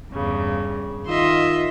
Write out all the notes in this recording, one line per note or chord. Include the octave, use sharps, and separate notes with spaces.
E2 G2 C#3
D#3 F4 D#5 E5 C6